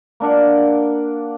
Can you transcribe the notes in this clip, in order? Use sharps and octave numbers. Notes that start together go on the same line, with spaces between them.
A#3 D4 A#4 F#5